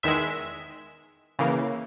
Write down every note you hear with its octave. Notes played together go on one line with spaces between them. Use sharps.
E2 D#3 G#3 E5
C#3 E3 A#3